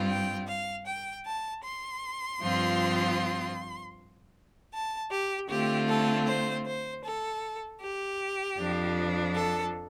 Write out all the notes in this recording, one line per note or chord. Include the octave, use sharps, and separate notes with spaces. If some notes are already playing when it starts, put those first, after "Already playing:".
Already playing: G2 G3 C4 F4
G5
F5
G5
A5
C6
G2 F3 C4 F4
A5
G4
D3 A3 C4 F4 G4
A4
C5
C5
A4
G4
F2 F3 D4
A4